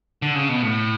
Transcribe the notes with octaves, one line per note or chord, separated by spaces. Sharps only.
D3
C#3
B2
A2